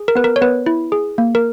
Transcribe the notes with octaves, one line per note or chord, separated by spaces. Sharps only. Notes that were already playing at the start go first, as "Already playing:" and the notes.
Already playing: G#4
A#4
B3 B4
A#4
C#5
B3 B4
E4
G#4
A#3
A#4